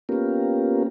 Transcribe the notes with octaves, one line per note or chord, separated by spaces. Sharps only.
A#3 B3 C#4 F4 G4 A#4